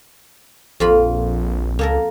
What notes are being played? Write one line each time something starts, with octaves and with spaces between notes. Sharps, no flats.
A#1 F2 F4 B5
C#2 A#3 A4 A#4